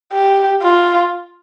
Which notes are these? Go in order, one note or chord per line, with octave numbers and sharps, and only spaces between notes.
G4
F4